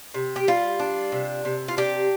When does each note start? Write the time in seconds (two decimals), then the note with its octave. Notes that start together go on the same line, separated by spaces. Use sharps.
0.14 C3
0.36 G4
0.47 G3 F4
0.80 D4
1.12 C3
1.45 C3
1.68 F4
1.77 D4 G4